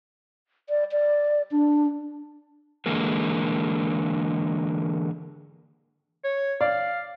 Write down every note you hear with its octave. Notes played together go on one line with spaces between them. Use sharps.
D5
D5
D4
D3 E3 G#3 A#3 A#4
C#5
D5 F5